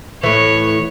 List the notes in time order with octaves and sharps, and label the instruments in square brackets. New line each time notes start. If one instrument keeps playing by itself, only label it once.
[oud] A2 E3 [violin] C#5